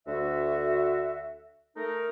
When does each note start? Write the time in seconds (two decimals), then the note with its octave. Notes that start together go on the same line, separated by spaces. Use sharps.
0.07 D2 F#4 E5
1.76 A3 D#4 A#4